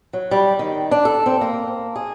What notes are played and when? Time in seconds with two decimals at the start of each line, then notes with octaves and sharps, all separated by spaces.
0.13 F#3
0.31 G3
0.59 D#3
0.91 D4
1.05 A4
1.26 C4
1.41 A#3
1.96 G#4